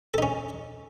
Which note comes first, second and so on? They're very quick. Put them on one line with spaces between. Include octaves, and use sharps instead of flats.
A4 D#4 C#4